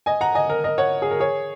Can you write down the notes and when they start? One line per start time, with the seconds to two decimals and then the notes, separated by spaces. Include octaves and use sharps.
0.06 D#5 G#5
0.21 F#5 A#5
0.35 D#5 G#5
0.50 A#4
0.64 A#4 D#5
0.78 C#5 F#5
1.02 G#4
1.11 A#4
1.20 G#4 C#5